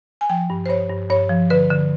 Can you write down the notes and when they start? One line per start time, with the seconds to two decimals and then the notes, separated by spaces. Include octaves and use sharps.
0.21 G#5
0.30 F3 G5
0.50 G2
0.66 C5
0.70 G2 C#5
0.90 G2
1.10 G2 C#5
1.30 F3
1.50 D3 B4
1.70 D3